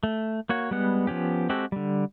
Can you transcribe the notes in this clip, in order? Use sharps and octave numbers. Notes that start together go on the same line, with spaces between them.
A3
A#3 F#4 C#5
G3 G#3 B3 F#5
F3 B3 C#4 G4
G#3 C4 F#4 G4 A4
D3 G3